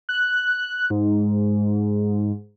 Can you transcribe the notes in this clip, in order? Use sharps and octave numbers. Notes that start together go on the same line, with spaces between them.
F#6
G#2